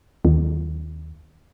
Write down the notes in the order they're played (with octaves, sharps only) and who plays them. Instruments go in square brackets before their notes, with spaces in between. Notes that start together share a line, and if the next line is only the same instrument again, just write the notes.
[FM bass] D#2